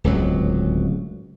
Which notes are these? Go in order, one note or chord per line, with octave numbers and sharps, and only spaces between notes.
D1 C#2 F#3